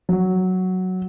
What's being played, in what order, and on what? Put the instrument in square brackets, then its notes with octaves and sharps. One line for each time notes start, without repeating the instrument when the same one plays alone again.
[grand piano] F#3